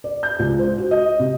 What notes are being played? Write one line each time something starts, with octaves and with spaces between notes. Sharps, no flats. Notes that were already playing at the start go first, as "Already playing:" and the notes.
D5
G6
C#2
C5
F#4
D#5
C3